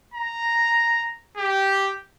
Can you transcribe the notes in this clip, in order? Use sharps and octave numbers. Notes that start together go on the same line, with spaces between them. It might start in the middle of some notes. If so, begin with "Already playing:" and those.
A#5
G4